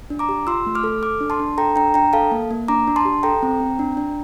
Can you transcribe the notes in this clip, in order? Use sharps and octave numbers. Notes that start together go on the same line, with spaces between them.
D4
A#5 D6
G4
F4 C6 E6
A3
D6 F6
A4
A4 D6 F6
D4
A5 C6
D4
A4 G5 A#5
D4 G5 A#5
D4 G5 A#5
A4 F5 A5
A#3
A#3
D4 A#5 D6
D4
A5 C6
G4
A4 G5 A#5
C4
C4
D4
D4